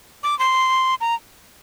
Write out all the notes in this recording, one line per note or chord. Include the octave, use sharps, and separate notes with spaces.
D6
C6
A#5